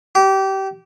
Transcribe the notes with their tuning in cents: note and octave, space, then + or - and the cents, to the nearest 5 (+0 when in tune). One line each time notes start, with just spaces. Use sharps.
G4 -25